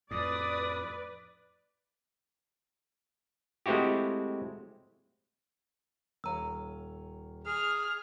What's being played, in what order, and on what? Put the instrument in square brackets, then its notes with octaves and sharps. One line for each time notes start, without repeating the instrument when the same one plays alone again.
[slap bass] F2 A2 [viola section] B4 D5 [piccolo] D#6
[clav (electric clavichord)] G#3 A3 C4 E4 F#4 G4
[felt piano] D#1 C#5 F5 [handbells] A#5 E6
[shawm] G#4 [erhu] F6